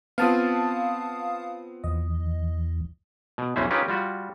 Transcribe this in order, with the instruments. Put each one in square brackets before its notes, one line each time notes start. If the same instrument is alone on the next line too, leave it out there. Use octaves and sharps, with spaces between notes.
[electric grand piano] B3 C4 F4 [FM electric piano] F5 A5 D#6
[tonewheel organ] E2 [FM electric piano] D#5
[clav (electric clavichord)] B2
B1 E2 E3 C#4 C5 E5
C#4 D#4 F4 G4 A#4 B4
G3 F4 F#4